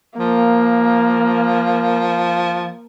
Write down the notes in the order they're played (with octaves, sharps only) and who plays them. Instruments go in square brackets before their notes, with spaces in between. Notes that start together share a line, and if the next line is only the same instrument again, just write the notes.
[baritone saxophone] F3 [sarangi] A#3